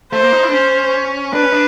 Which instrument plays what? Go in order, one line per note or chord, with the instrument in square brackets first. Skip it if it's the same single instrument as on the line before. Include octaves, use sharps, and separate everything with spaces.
[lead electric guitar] A3 [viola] C5
[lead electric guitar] A#3
D#4
E4
D4
[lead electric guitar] C#4 [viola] C5
[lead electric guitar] D4 [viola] B4
[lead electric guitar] C#4
D4